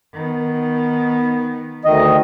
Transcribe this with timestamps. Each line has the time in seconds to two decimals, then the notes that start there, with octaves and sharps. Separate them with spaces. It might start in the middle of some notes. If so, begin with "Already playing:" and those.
0.13 D#3 B3
1.85 D2 D#3 D#5